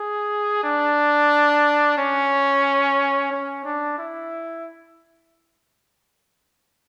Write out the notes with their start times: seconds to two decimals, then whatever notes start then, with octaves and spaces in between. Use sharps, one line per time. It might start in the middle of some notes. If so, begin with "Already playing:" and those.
Already playing: G#4
0.64 D4
1.98 C#4
3.32 C#4
3.65 D4
3.98 E4